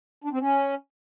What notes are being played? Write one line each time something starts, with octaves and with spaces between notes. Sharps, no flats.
D4
C4
C#4